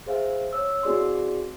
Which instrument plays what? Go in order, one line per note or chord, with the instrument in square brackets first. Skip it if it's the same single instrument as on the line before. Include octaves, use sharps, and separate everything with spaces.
[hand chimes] G#4 C5 E5 F5
C#5 E6
C4 E4 F#4 G#4 D5 C6